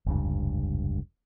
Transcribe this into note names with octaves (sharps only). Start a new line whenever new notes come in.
F1 C#2 G2